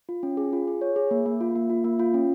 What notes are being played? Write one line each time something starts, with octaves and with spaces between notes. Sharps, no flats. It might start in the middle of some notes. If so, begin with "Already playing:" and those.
F4
C#4
G#4
F4
G#4
C#5
G#4
A#3
A#3
F4
A#3
F4
A#3
F4
C#4